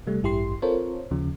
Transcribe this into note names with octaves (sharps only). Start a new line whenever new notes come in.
C3 G3 A3
A1 G2 E4 G4 C6 C7
C4 F4 A4 A#4 C5 C#5
D#2 C#3 F3